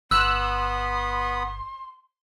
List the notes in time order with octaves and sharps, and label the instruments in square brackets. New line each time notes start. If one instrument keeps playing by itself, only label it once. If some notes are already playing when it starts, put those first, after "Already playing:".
[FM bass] G1 [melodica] B3 B5 D#6 [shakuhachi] C6 [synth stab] E6 F#6